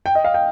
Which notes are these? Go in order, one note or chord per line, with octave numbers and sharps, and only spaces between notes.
G5
D#5
F5
G5